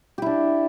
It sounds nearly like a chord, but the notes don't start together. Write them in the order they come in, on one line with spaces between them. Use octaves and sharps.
G4 E4 D4